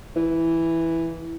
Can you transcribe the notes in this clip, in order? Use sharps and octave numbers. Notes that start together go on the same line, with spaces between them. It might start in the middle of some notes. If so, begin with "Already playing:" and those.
E3